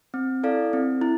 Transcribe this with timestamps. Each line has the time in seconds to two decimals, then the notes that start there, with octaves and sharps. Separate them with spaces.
0.14 C4
0.43 E4 A4 D5 F5
0.73 C4
1.01 E4